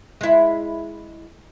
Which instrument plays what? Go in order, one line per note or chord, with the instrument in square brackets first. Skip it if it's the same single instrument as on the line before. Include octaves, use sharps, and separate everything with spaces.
[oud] G#3 E4